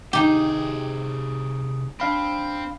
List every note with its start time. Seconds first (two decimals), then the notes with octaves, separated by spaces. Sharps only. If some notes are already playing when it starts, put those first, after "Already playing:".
0.13 C3 D#4 G4 G#4
2.00 C4 D4 F5 B5